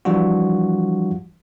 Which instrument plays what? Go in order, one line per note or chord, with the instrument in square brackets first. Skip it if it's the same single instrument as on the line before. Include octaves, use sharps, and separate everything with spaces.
[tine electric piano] E3 F3 G3 D4 F4 F#4